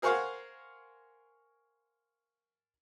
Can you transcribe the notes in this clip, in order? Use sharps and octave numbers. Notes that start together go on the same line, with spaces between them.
G#4 A#4 C5 C#5 F5 F#5